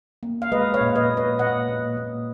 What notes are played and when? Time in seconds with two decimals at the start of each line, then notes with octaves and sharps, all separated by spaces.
0.23 A#3
0.42 F5
0.52 G#3 B4 D#5
0.74 C#5 F5
0.81 A#2
0.96 B4 D#5
1.10 A#2
1.17 B4 D#5
1.39 A#2 D#5 F#5
1.69 A#2
1.97 A#2